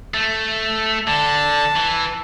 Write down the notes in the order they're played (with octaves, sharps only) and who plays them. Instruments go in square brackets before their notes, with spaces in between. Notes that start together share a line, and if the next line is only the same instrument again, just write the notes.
[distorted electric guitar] A3
[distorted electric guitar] D3 [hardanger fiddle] A5
[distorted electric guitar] E3